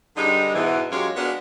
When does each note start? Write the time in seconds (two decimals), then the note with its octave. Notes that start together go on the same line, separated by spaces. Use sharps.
0.16 G2 D3 G3 G#3 D#4
0.54 G#2 B2 E3
0.90 F#2 G#3 F4 G4 C#5
1.15 G#3 B3 D4 F4 F#4 A#4